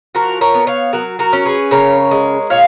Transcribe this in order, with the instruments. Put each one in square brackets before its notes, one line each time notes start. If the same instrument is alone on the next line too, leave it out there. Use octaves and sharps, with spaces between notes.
[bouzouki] F3 F#4 A#4
A#4 C#5
B3
C#5 F5
F#3 F#4 A#4
F#4 A#4
C#4
G#4 B4
C#3 A#4 C#5
G#3
A#2 C#5 F5